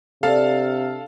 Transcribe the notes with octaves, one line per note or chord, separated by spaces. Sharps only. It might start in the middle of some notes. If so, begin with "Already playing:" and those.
C3 D4 A4 F5